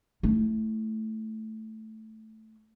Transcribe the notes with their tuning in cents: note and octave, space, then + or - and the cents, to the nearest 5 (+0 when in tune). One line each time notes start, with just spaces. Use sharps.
A3 +0 E4 +0